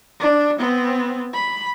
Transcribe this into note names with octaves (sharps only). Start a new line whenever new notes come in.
D4
B3 C4
B5